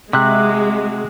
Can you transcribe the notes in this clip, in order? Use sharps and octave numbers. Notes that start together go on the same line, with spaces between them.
C3 G#3 F#4 E5 F#6